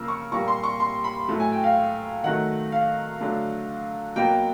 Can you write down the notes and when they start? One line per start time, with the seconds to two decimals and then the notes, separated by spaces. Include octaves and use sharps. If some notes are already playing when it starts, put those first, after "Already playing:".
Already playing: C#3 F3 A#3 E6 F6
0.08 C#6
0.31 A#2 G3 A#3 C#6
0.48 C6
0.63 C#6
0.80 C6
1.04 B5
1.28 A2 F#3 A3
1.40 G#5
1.52 G5
1.64 F5
2.24 D#3 F#3 A3 F#5
2.72 F5
3.20 D3 F#3 A3
4.16 B2 F#3 A#3 G5